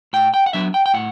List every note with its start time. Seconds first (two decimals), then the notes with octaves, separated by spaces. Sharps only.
0.13 A2 G5
0.34 G5
0.46 F#5
0.53 F#3 B3 D4 E5
0.74 G5
0.86 G5
0.94 A2 F#5